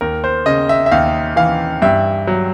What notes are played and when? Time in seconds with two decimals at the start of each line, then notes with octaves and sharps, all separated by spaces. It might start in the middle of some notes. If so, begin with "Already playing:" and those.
0.01 D#2 A#4
0.24 C5
0.46 C#3 D#5
0.69 E5
0.86 E5
0.92 D#2 F5
1.36 E3 F5
1.82 G2 E5
2.27 F#3